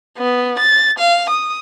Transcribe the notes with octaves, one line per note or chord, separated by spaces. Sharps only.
B3
A6
F5
D#6